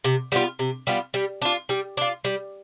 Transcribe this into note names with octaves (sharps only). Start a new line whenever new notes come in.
C3
G3 B3 F4
C3
G3 B3 F4
G3
D4 F4
G3
D4 F4
G3